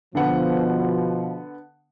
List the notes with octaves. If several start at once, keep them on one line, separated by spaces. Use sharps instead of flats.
B2 D3 F3 B3 F#5